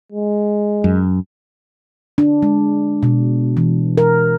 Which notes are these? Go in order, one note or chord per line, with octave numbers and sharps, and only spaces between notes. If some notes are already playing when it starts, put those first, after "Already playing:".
G#3
F#2
D4
G#3
B2
E3
A#4